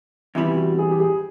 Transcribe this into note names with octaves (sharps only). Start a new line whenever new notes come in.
E2 C3 E3 G3 E4
F#4
G#4
G4
G#4